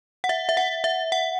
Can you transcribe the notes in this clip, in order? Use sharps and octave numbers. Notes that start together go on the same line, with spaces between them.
F#5
E5
E5
F#5
E5
F#5